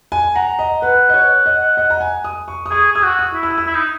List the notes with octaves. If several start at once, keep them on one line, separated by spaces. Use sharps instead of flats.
G#5
F#5 A#5
D#5
B4 F#5
D#5
C#5
D#5
D#5
A#5
G#5
D#6
C#6
D#6
G#4 C#6
G#4 E6
F#4
D#6
E4
E6
D#6
E6
E4
D#4